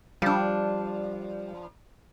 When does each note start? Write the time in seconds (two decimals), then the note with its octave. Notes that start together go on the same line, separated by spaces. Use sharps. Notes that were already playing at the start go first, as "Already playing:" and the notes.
0.22 F3 G3 D4